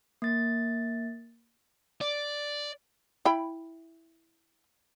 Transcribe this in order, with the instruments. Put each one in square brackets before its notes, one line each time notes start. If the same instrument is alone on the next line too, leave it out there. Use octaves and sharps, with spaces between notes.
[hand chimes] A#3 A6
[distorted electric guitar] D5
[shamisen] E4 G5 B5